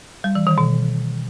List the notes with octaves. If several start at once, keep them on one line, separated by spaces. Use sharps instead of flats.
G3
E3
D#3
B2